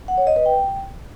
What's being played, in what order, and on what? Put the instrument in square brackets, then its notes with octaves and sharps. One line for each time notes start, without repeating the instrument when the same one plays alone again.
[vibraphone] F#5
C#5
D#5
B4
G5